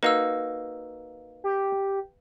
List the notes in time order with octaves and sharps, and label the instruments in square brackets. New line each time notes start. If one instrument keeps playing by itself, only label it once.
[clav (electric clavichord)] A#3 D#4 F#4 [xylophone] B4 F5 E6
[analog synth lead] G4